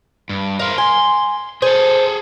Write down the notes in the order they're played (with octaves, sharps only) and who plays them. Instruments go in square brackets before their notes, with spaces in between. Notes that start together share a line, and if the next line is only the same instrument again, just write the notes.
[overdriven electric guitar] G2
[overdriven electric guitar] A#4 C5 [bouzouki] F5
[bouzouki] G#5 [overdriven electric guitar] C6
[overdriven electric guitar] G#4 A4 [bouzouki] C5